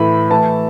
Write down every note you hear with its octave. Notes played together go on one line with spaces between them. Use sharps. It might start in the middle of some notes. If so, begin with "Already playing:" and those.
Already playing: A2 E3 A3 E4 B5
E3 A3 E4 A5